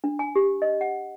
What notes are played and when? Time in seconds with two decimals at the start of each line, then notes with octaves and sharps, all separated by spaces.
0.04 D4
0.19 G#5
0.36 G4
0.62 D#5
0.81 F#5